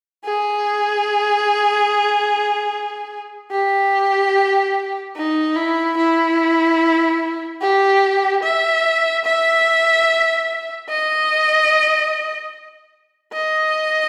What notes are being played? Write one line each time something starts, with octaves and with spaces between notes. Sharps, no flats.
G#4
G4
D#4
E4
E4
G4
E5
E5
D#5
D#5